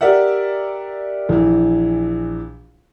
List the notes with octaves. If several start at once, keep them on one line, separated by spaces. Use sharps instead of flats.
G4 A#4 D5 E5 F#5
A#1 E3